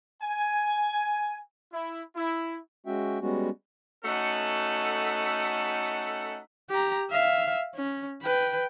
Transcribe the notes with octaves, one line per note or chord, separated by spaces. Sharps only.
G#5
E4
E4
G#3 C#4 F#4 E5 G5
G3 G#3 B3 C#4 F#4
A3 C#4 D#4 F#4 A4 F#5
G4 A#5
E5 F5
C#4
B4 G5